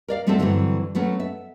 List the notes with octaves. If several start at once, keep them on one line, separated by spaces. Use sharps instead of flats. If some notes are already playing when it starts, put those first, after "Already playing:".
A#4 D5 F5
G3 A3 C4 C#4 F#4 A4
G2 D3 E3 F#3 C4
F#3 A3 B3 C#4
E5